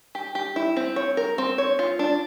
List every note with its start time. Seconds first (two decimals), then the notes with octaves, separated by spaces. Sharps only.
0.15 G4
0.35 G4
0.56 E4
0.77 C4
0.96 C#5
1.17 A#4
1.38 C4
1.58 C#5
1.79 F4
1.99 D4